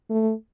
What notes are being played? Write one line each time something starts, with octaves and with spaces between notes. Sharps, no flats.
A3